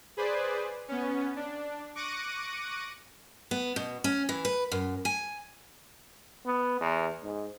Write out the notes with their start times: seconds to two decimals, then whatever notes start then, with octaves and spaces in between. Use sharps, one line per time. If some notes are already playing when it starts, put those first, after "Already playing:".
0.17 G#4 B4 C5 D5
0.88 B3 C#4
1.36 D4
1.95 C#6 D6 F#6 A#6 C#7 D#7
3.51 B3
3.76 B2
4.04 C#4
4.29 E3
4.45 B4
4.72 F#2
5.05 G#5
6.46 B3
6.81 E2
7.23 G#2